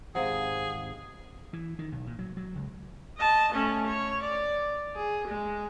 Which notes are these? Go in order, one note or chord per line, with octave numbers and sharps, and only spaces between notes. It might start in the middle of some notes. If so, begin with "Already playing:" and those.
G#1 C3 G#3 G#4 F5 F#5
E3
D#3
B1
A#2
F#3
F#3
C#2
D#5 A5
A3 C#4
C#5
D5
G#4
G#3